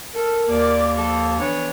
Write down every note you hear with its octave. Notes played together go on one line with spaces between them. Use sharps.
A4 A#4
D#2 A#3 D5
F3 A4
E3 B3 D4 C#5